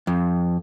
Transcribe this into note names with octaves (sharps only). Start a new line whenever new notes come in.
F2